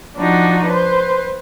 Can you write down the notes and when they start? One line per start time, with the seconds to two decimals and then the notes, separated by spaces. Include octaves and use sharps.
0.17 F3 D4 D#4 F#4
0.66 B4 C5